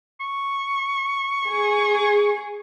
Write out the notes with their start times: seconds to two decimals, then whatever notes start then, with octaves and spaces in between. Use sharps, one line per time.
0.20 C#6
1.47 G#4